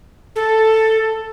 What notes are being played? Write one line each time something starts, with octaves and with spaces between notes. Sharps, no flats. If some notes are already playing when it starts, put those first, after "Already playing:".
A4